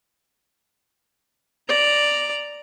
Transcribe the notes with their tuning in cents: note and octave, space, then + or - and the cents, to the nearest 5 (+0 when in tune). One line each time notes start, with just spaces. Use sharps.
D5 +0 A#5 +0